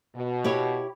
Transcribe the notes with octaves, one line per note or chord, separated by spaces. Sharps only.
B2
E4 G4 C#5